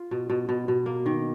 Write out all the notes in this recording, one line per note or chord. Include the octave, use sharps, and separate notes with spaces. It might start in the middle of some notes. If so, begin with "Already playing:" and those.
Already playing: F4
B2
B2
B2
B2
A#3
D#3